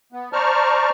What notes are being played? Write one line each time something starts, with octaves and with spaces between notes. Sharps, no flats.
B3
C5 D5 A5 A#5 C#6 F6